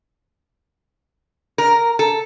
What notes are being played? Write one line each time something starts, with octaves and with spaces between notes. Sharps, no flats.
A#4
A4